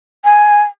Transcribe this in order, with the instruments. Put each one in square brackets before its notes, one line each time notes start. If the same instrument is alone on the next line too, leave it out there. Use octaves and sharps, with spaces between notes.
[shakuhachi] G#5